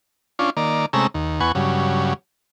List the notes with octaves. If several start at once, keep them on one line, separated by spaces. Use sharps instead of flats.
C#4 D4 F4
D#3 A#3 D5
C3 G#3 A3 C#4 A#5 E6
D#2
E2 B3 F#5 G#5 C#6
G2 C#3 F#3